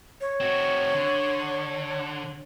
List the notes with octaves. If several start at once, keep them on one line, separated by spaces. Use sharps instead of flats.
C#5
C4 F#4
D3